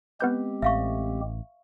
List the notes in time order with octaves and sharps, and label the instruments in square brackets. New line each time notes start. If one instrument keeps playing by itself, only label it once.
[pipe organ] G#3 C4 G4 [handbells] B3 B4 G6
[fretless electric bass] A1 [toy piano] E5 F5 C#6